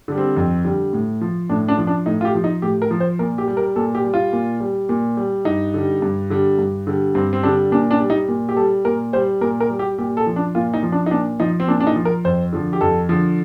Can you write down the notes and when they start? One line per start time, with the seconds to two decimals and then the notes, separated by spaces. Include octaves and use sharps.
0.08 D3 G3
0.18 C4
0.36 F2
0.65 D3 G3
0.93 A2
1.21 F3
1.49 A2 D4
1.68 D4
1.78 F3
1.87 D4
2.06 A2 D#4
2.21 F4
2.25 G4
2.34 F3
2.44 D#4
2.62 A2 G4
2.82 A#4
2.91 F3
3.00 C5
3.19 A#2 A#4
3.38 G4
3.48 G3
3.57 A#4
3.76 A#2 A4
3.95 G4
4.04 G3
4.14 F4
4.33 A#2
4.60 G3
4.89 A#2
5.17 G3
5.45 G2 D#4
5.74 D3 G3
6.02 G2
6.30 D3 G3
6.59 G2
6.87 D3 G3
7.15 G2 C4
7.33 C4
7.43 D3 G3 D4
7.72 A#2 D4
7.91 D4
8.00 G3
8.10 D#4
8.28 A#2
8.49 G4
8.57 G3 A4
8.85 A#2 A#4
9.13 G3 C5
9.41 A#2 A#4
9.60 A#4
9.70 G3
9.79 G4
9.98 A#2 G4
10.17 A4
10.26 F3
10.36 D4
10.55 A#2 F4
10.74 D#4
10.83 F3
10.92 D4
11.06 D#4
11.11 A#2 D4
11.40 F3 D#4
11.60 C4
11.68 A#2 D4
11.80 D4
11.87 D#4
11.96 F3
12.05 A#4
12.25 F2 C5
12.53 D3 F3
12.73 G4
12.81 F2 A4
13.09 D3 F3